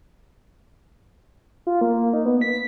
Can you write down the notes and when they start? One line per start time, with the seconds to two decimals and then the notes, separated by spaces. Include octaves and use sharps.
1.67 F4
1.81 A#3
2.13 D#4
2.26 B3
2.41 B6